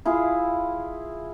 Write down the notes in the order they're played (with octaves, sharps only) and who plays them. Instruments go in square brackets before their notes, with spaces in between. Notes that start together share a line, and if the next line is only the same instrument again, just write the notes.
[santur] E4 F4 G#4